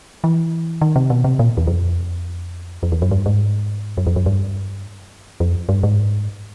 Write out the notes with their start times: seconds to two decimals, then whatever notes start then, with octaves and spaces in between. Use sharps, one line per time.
0.24 E3
0.81 D#3
0.96 C3
1.10 B2
1.24 C3
1.39 A#2
1.57 E2
1.67 F2
2.83 F2
2.92 E2
3.02 F#2
3.11 G2
3.26 G#2
3.97 F#2
4.07 F2
4.16 F#2
4.26 G2
5.40 F2
5.69 G2
5.83 G#2